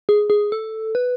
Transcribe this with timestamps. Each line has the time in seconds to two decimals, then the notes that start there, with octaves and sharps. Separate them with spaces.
0.09 G#4
0.30 G#4
0.52 A4
0.95 B4